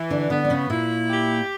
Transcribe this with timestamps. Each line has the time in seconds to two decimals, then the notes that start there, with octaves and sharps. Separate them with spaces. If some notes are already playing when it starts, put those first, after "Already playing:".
Already playing: E3
0.10 D3 D4
0.30 D3 B3 D4
0.45 D4
0.50 C#3 C#4
0.70 A#2 A#3 E4
1.10 G4